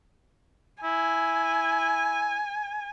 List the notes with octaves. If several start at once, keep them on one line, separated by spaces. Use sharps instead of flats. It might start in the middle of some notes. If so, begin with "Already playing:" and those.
E4 G#5